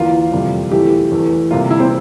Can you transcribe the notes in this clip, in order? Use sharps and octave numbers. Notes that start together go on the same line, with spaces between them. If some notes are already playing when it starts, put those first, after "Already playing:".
Already playing: E2 E3 A#3 E4 F4
F2 C3 G3
E3 A3 E4 G4
E2 E3 A3
C3 G3 A#3 F4
E4
C4